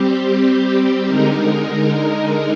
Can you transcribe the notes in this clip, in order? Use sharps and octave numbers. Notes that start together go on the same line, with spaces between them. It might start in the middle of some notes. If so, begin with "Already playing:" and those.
Already playing: G3 C4 G4
D3 G#3 D#4 A#4